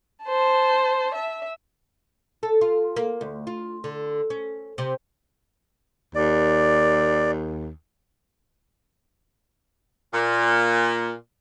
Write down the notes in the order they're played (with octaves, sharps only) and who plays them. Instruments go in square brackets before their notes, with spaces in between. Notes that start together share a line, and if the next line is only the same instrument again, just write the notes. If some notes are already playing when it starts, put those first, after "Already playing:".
[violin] C5 A5
E5
[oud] A4
F4
A#3
D2
F4
D3
C#4
C3
[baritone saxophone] D#2 [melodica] D5
[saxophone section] A#2